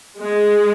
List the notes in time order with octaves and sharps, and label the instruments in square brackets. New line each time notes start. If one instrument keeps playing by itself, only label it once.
[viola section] G#3